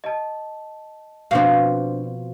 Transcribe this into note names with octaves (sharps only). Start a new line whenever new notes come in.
D#5 A5
B2 F3 C4 D4 F5